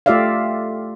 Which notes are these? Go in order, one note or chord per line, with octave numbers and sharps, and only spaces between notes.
A3 F4 G4 D5 E5 F5